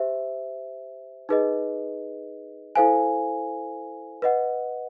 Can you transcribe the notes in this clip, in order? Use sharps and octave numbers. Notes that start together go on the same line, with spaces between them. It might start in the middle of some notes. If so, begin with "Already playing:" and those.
Already playing: G4 C5 E5
D#4 G#4 B4 D#5
E4 A4 C5 F5 G#5
B4 D#5 F#5